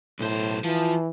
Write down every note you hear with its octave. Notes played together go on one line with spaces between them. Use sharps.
B1 A2 C5
E3 F3